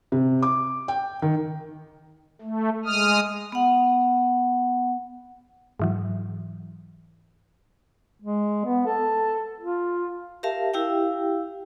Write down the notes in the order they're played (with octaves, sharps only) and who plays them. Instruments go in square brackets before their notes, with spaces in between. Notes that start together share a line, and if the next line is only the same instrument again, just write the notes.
[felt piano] C3
D6
G5
D#3
[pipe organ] A3
G#3 D#6 F6
[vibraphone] B3 F#5
[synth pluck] G#2 E3 F#3
[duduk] G#3
B3
A4
F4
[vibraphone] G4 A#4 E5 F5 A5
E4 G4 F5 G5